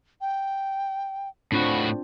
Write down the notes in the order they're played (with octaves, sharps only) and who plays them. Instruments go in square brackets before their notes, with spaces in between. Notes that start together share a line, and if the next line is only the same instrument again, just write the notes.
[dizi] G5
[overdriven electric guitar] A2 F#4 [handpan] C4 D4 F4 [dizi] B5